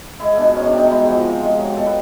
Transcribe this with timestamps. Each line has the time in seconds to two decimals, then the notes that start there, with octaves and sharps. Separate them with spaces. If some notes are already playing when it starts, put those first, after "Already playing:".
0.20 G#3 E4
0.37 B2 D4
0.55 G#2 C#4
0.67 D4
0.73 G3
0.78 D#4
0.90 G#3 E4
1.07 F3 F#4
1.25 C3
1.42 G#3
1.59 F#3
1.68 G4
1.76 B2 A4
1.86 B4